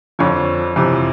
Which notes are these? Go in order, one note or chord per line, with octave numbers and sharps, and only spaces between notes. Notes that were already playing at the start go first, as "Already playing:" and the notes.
F2 D3 F3 C#5
F2 C3 E3